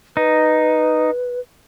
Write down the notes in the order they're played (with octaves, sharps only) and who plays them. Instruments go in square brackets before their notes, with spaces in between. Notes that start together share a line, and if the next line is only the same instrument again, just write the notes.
[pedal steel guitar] D#4 [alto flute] B4